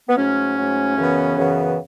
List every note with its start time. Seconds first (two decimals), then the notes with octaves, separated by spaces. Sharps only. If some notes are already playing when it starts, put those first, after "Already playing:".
0.09 B3
0.17 G#2 F#3 A3 C#4
0.57 G#2 F#3 A3
0.96 F#2 C#3 E3 B3
1.36 F#2 C#3 E3 B3